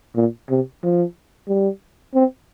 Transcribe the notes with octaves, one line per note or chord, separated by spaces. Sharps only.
A#2
C3
F3
G3
C4